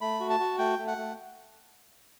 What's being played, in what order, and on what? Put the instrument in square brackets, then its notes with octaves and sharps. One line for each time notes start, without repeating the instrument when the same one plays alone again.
[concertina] A3 B5
F#4
A5
F#4
A3 G5
A3
F#5
A3